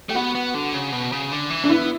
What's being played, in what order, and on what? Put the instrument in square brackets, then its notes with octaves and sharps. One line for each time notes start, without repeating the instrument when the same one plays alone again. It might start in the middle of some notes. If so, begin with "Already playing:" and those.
[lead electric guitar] A3 [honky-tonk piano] G4
[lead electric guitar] B3 [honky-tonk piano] F#4
[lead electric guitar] B3
D3
C#3
B2
C#3
D3
E3
[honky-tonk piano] D4
[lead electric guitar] B3 [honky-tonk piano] E4